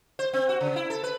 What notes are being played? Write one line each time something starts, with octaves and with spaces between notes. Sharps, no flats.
C5
C4
F#4
C#3
E4
A4
B4